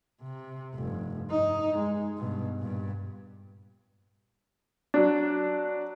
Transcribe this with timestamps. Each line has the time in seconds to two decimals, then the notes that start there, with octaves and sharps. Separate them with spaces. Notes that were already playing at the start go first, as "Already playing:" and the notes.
0.22 C3
0.75 F1 G2
1.31 G2 D#4
1.78 G#3
2.18 G2 B2
2.59 G2 A#2
4.94 F#3 D4